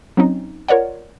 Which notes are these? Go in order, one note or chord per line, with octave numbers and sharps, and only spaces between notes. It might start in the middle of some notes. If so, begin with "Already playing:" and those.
F#3 C4 C#4 D#4
F4 A#4 C#5 D5 F#5